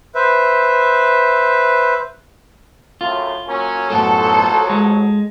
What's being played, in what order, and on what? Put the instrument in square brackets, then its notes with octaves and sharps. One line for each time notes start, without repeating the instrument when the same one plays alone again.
[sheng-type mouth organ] B4 C5 E5
[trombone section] F#2 A2 [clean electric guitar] F4
[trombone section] F#3 A#3 C#4
[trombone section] A1 F3 F#3 [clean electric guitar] F#2 A2 B3 [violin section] A4
[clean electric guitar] G#3